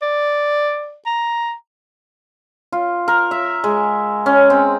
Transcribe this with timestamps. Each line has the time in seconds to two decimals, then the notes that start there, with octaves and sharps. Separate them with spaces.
0.02 D5
1.06 A#5
2.72 F4
3.08 A#4
3.31 E5
3.64 G#3
4.26 C#4
4.50 C4